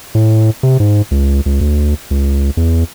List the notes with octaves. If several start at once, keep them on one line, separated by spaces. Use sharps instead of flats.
A2
C3
G#2
C#2
C#2
D2
C#2
E2